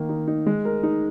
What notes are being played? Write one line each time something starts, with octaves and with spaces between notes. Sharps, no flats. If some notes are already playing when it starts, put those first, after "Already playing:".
Already playing: D#3 A#3
D#4
D#4
G#3
A#4
D#4